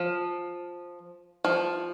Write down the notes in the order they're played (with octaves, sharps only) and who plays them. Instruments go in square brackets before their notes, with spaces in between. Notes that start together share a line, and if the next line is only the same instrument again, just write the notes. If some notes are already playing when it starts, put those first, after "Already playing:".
Already playing: [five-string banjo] F3
F3